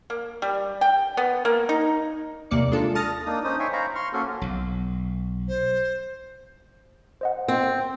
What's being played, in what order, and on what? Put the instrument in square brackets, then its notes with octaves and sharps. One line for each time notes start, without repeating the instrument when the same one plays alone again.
[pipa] A#3
G3
G5
B3
A#3
D#4
[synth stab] D#2 C3 A#3 D5 C#7
G#3 D4 F4 A4
A5 D#6 F6 A6 A#6
[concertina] A#3 D4 D#4 D#6
C#4 D#4 C5 D#6
C#5 E5 G5 G#5 C6 C#6
C5 F5 A#5 B5 C#6
C6 C#6 F6
A#3 C#4 F#4 A4 A#4
[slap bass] B1
[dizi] C5
[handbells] C5 D#5 F#5
[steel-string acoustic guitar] C4